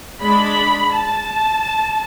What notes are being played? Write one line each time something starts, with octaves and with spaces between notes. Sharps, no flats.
G#3 D4 B5
A5